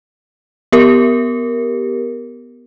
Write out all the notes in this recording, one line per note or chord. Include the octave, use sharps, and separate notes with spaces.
B3 G4 A#4